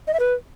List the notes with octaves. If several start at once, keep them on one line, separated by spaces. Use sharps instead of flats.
D#5
E5
B4